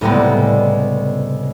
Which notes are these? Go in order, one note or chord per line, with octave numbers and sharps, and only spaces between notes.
C#2 A2 C3 G3 G#3 B3